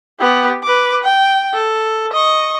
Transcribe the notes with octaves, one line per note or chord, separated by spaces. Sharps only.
B3 G4
B4 D6
G5
A4
D#5 C#6